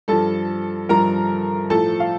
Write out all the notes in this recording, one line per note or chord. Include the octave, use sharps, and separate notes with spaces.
G2 F3 A4 A5
G2 F3 A#4 A#5
A2 F3 A4 A5
F5